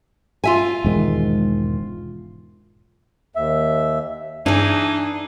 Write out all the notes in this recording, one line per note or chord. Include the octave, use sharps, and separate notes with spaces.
F4 E5 G#5
E1 G#2 D#3
D#2 E5
G2 E3 D4 D#4 G#4